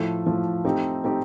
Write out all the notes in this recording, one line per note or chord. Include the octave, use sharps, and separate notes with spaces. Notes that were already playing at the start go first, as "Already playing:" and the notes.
Already playing: A2 F3 A3
A2 F3 A3
A3 C4 D#4 G4
A3 C4 D#4 G4